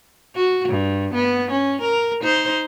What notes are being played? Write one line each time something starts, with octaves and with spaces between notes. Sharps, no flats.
F#4
G2
B3
C#4
A#4
D#4 C5